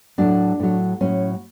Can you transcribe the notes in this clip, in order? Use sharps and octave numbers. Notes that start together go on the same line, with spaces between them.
A2 F#3 D4
A2 F#3
A2 F#3 C#4